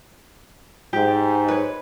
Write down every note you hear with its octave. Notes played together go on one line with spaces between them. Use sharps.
G#2 G4
B4 C#5